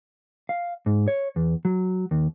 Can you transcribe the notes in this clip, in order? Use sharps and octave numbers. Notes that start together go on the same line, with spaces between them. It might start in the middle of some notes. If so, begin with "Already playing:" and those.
F5
G#2
C#5
E2
F#3
D#2